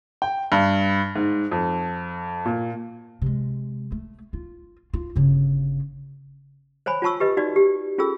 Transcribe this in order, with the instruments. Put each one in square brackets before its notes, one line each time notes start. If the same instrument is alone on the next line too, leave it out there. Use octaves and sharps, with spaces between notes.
[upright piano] G5
G2
G#2
F2
A#2
[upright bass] C3 G#3
A3
F4
F4
G1 C#3
[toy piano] C5 C#5 G#5 B5
F4 C#5 A5 C#6 E6
G4 B4 D#5
D#4 F#4 D5
G4
C#4 F4 G#4 A4 E6